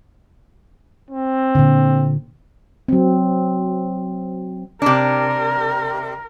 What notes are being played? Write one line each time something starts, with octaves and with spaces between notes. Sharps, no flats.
C4
A#2 D3
F#3 C4
C3 D4 A#4